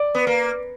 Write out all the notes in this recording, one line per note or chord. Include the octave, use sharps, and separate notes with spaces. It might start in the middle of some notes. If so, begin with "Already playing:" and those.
Already playing: D5
B3
A#3